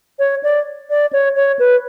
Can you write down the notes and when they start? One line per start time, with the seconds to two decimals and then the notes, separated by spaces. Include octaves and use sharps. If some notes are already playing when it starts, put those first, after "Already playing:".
0.19 C#5
0.43 D5
0.90 D5
1.13 C#5
1.36 C#5
1.59 B4